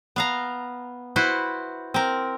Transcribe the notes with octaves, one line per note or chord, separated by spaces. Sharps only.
B3 F5 A#5
E4 F#4 B4 C5
C4 A#4